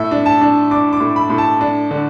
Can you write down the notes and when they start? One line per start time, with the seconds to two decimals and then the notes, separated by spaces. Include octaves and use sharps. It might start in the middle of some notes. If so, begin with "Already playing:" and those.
Already playing: A2 E5
0.11 D4
0.26 A5
0.41 D4
0.71 D4 D6
0.93 D6
1.00 A2
1.16 B5
1.30 A2
1.38 A5
1.61 D4
1.91 D3